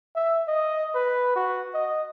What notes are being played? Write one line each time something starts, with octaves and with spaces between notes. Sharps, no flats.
E5
D#5
B4
F#4
D#5